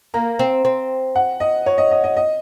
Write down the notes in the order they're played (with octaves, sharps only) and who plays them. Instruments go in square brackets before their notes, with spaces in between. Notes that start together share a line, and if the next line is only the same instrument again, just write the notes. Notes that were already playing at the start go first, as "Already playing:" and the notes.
[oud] A#3 [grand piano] A#5
[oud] C4
C4
[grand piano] F#5
D#5
C#5
D#5
D#5
D#5
D#5